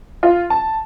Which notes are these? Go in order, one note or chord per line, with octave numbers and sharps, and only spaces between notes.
F4
A5